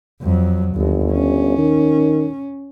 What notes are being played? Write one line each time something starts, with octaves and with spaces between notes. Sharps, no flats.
F2 F#3
G1 D#2
C#4
D#3